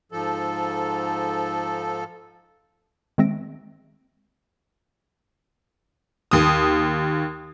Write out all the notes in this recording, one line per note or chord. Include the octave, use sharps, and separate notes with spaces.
G#2 F3 A4
D#3 G#3 C4 E5 A#6 D7
D#2 D#6